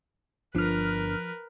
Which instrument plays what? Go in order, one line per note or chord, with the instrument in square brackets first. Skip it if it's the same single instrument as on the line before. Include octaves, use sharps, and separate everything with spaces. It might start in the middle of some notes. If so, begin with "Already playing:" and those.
[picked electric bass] G1 D4 [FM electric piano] F3 F6 [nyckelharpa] A#4 B4